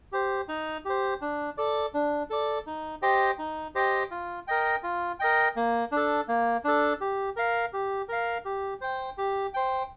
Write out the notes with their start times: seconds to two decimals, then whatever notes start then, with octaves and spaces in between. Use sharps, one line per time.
0.12 G4 C5
0.49 D#4
0.85 G4 C5
1.21 D4
1.57 A4 D5
1.94 D4
2.30 A4 D5
2.67 D#4
3.02 G4 C5 D#5 G5
3.39 D#4
3.75 G4 C5 D#5 G5
4.11 F4
4.47 A#4 D#5 G5
4.83 F4
5.20 A#4 D#5 G5
5.56 A#3
5.92 D4 A4
6.28 A#3
6.64 D4 A4
7.01 G4
7.36 A#4 F5
7.73 G4
8.09 A#4 F5
8.45 G4
8.81 C5 G5
9.18 G4
9.54 C5 G5